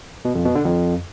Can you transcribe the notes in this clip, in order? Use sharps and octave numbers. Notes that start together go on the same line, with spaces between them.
B2
F2
B2
D3
F2